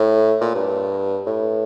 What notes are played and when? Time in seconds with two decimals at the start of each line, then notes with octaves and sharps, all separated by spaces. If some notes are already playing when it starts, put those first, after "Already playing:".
Already playing: A2
0.41 A#2
0.55 G2
1.26 A2